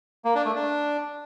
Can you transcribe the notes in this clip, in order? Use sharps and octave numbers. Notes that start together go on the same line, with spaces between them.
A#3
D4
A3
D4